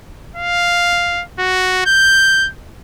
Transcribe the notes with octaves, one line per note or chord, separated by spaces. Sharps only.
F5
F#4
G6